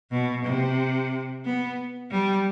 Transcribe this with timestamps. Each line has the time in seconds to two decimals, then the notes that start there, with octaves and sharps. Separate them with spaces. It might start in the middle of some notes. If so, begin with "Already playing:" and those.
0.11 B2
0.45 C3
1.45 B3
2.11 G3